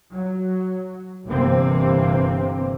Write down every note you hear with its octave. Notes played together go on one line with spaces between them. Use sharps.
F#3
G1 C3 E3 A#3 C4